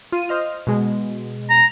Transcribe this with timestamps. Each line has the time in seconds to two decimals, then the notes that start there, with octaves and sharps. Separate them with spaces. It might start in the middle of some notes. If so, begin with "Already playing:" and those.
0.12 F4 D#7
0.29 C5 D#5 F6
0.67 B2 G#3
1.50 A#5